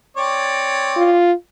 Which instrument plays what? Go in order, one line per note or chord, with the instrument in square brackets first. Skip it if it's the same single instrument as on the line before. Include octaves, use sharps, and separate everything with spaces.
[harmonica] C4 C#5 D5
[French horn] F4